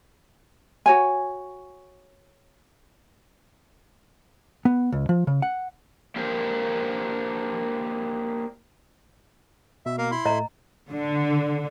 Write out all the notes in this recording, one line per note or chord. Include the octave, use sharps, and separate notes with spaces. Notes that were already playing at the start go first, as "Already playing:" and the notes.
F#4 C#5 G#5
B3
C#2
F3
C#3
F#5
A#3 D4 G4 A#4 C5
B2 E5
A#3 A#4 F5
E4 B5 C6
A2 A3 D#5 A#5
D3